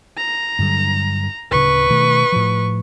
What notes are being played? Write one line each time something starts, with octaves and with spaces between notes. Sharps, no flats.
A#5
G2 D3 F#3
D1 C#3 B4 C#6
B2 D#3 A3
A2 F3